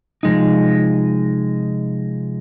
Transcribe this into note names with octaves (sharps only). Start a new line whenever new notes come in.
C3 F3 G#3 D#4